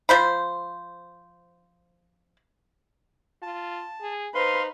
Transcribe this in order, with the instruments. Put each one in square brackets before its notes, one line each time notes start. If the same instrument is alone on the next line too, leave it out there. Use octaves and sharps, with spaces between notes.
[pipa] F3 C5 B5
[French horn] F4 [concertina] A5
[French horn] G#4
[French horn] D#4 [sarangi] B4 [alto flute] C5 [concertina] F5 C6